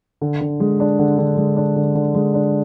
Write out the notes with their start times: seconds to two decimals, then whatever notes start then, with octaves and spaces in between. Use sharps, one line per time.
0.21 D3
0.41 D3
0.60 G#3
0.80 D4
0.99 D3
1.18 D3
1.37 G#3
1.57 D4
1.76 D3
1.95 D3
2.15 G#3
2.34 D4